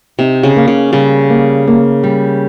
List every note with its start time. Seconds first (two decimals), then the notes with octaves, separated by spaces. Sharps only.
0.19 C3 D#4
0.43 C#3
0.56 A#3
0.68 C#3
0.92 C#3 G3
1.30 A#3
1.67 A#3
2.03 G3